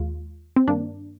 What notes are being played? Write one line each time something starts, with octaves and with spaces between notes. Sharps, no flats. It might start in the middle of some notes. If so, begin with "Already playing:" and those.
Already playing: D#2 G#3 F4
C4
G2 D#3 A#3 D4